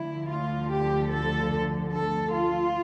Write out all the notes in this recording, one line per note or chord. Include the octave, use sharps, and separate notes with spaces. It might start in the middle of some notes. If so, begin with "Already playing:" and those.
Already playing: D2 D3 F3 E4
F4
G4
A4
A4
F4